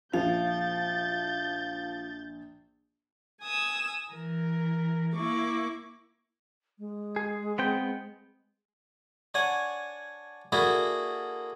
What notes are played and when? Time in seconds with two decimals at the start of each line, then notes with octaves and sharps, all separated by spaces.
0.13 A#1 F3 F5 G6 A6
3.42 G#5 D#6 E6
4.11 E3 A#4
5.14 A#3 E4 C#6 D6
6.79 G#3
7.16 G#4
7.58 B3 C4 G5
9.34 D4 C#5 F#5 G#5
10.52 A#3 D4 E4 F#4 G#4 A4